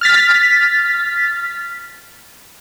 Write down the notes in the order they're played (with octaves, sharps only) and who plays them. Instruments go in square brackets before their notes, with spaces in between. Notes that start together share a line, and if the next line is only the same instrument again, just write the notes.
[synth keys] F6 A6 B6